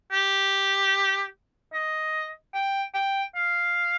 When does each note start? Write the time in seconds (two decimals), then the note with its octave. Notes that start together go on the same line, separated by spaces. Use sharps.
0.12 G4
1.74 D#5
2.55 G5
2.94 G5
3.36 F5